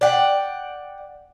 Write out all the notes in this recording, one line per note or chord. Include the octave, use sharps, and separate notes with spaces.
D5 F#5 G5